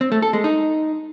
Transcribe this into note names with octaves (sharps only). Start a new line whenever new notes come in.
C4
A3
A4
G#3
D#4